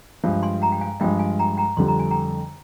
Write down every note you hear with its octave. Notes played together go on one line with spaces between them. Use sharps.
G2 F3 G#3
G#5 C6
G5 A#5
G5
F5 G#5
G2 F3 G#3 D#5 G5
F5 G#5
G5 A#5
G5 A#5
F2 D3 G3 C6
A#5
G#5
G5 A#5